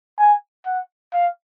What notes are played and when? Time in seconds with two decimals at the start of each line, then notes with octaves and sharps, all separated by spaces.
0.19 G#5
0.66 F#5
1.13 F5